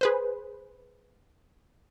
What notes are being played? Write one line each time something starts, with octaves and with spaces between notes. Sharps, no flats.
G#4 B4 C5